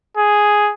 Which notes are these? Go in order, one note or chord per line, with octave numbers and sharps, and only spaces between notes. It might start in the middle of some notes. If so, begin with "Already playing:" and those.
G#4